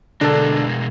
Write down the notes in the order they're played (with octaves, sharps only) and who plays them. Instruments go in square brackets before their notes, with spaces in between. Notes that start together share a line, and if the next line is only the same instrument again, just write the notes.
[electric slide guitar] B2 G#3 A#4 [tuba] D3 [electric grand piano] D4 A4